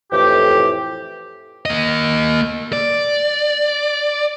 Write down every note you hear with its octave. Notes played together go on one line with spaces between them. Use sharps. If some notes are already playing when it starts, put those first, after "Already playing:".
F2 A2 E3 G4
A#3 D#5
D5